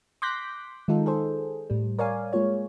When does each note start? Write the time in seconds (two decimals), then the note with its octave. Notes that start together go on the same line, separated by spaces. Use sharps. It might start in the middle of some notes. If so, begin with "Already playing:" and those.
0.22 C6 D6 F#6 G6 A#6 B6
0.88 D#3 G#3 D#4 F4 A4
1.06 G#4 A4 C5
1.70 A2 G3
1.99 A#4 C#5 D5 F5 G#5
2.33 G#3 A#3 F4 C#5